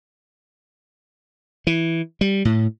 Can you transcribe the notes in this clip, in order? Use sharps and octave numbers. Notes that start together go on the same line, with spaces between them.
E3
G3
A2